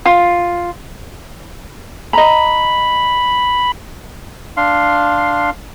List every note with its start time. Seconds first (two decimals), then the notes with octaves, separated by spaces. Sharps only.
0.05 F4
2.13 D#5 A#5 B5
4.57 D4 F5 C6